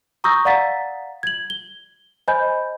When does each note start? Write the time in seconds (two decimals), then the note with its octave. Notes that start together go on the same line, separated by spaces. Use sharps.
0.24 A#5 C#6 D#6 E6 G6 A#6
0.45 D5 F5 F#5 A#5 A6 B6
1.23 G#6 F#7
1.50 G7
2.28 C5 D#5 G#5 B5 G6